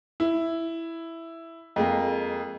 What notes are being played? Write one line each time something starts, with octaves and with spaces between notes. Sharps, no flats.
E4
F2 G#3 A#3